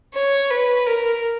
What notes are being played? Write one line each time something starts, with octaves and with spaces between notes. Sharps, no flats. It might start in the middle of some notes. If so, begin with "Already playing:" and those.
C#5
B4
A#4